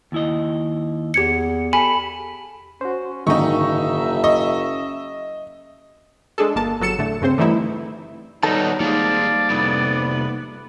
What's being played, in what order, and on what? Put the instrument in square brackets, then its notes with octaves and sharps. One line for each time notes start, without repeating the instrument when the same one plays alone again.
[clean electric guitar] D#2 E4 D#5
[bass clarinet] E2 [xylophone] G4 G#6 C#7
[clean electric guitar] G4 A4 [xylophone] G#5 [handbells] B5
[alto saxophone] C#4 [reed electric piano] F#4 C5
[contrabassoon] F#1 [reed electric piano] G#2 D3 D#3 [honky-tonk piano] D#4 C#6 [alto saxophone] E5
[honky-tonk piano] D#5 [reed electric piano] C#6
[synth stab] G#3 D4 G#4 A4
G1 A#3 A5
G1 F#3 A4 C#7 E7
A2 D3 A3
G2 C#3 C4 C5
D3 E3 G3 A3 D#4 E4
[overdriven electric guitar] D#3 G3 [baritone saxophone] F#3 [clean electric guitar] B3 A4 A5 [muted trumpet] D#4
[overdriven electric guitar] D#3 G#3 [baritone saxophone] F3 [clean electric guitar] G3 A#3 D#4 [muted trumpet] D5
[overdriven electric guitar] C2 F2 [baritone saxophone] B3